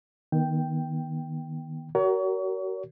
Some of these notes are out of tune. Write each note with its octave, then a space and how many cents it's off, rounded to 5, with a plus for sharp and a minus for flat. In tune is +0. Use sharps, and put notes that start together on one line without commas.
D#3 +0 B3 -35 G5 +0
F#4 +35 A#4 +0 C#5 +35